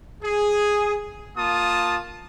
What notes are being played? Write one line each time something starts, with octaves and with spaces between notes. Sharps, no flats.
G#4
A#3 F4 A5 D#6